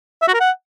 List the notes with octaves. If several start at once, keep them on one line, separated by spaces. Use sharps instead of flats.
E5
F#4
A#4
F#5